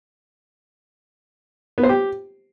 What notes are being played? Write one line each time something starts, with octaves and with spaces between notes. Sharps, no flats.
B3
C5
G4